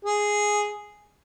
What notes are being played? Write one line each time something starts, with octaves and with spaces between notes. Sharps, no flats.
G#4